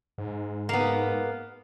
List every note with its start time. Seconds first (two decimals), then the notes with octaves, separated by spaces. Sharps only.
0.18 G#2
0.69 A#3 B3